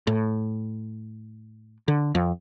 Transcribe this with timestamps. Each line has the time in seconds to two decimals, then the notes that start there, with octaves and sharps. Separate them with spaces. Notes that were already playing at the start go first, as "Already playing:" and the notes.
0.07 A2
1.88 D3
2.15 F2